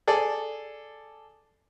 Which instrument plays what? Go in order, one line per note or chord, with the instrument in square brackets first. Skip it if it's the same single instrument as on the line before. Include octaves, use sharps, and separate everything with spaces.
[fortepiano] G#4 A4 D5